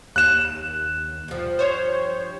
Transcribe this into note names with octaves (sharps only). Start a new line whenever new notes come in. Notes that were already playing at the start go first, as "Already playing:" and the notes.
D#2 F#6 E7
G2 F3
C5 C#5